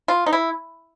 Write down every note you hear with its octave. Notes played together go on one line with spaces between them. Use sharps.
F4
D#4
E4